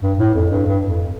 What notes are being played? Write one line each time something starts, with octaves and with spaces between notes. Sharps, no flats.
G2
A2
F2
G2
G2
F2